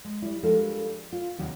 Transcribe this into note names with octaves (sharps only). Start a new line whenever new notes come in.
G#3
G3 E4
F3 G3 G#3 D4 A4 A#4
F4
D#2 C3 D#3 F#3